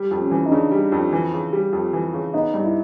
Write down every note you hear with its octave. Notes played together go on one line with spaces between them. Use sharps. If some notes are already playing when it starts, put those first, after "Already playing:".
Already playing: G3
F2
C#4
E3
D#4
C#3 D4
G3
F2
E3
C#3
G3
F2
E3
C#3
B3 D#4
G2
E4